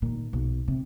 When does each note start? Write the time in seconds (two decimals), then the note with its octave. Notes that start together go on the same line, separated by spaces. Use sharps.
0.02 A#2 D#3
0.33 B1
0.68 C3